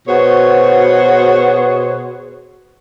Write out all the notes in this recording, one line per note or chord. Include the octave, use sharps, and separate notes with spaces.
B2 B3 F#4 G#4 C5 C#5